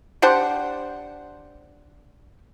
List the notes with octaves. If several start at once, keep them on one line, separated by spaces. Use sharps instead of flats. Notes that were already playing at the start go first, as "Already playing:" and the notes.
D4 G4 C5 F#5